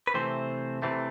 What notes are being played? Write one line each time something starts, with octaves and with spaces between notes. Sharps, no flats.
B4
C3 E3 A3 C4 C5
C3 E3 A3 C4